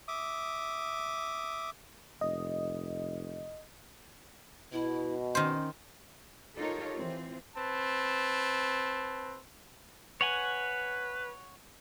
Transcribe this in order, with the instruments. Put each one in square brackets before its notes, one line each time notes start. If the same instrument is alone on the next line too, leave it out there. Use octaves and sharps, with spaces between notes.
[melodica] E5 D6 D#6
[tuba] F1 [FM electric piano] D#5
[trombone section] B2 [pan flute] E4
[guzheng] D#3 C5 [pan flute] C#4
[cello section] D#4 F4 G4 A4 A#4 C#5
E3 C4 F4
[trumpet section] C4 B4 A5
[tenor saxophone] B4 [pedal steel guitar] C#5 F#5 G#5